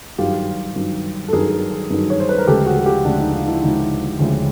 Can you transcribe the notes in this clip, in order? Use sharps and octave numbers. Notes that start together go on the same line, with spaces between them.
G2 D#3 F#3 F4 G4
G2 D#3 F#3
A4
G2 D#3 F#3 G#4 A#4
G2 D#3 F#3
C#5
C5
B4
A#4
D2 C#3 F3 G#3 G4 A4
F#4 G#4
F#4
F4 G4
D2 C#3 F3 G#3 D4
D#4
D#4 F4
D4 E4
D2 C#3 F3 G#3 D#4
D2 C#3 F3 G#3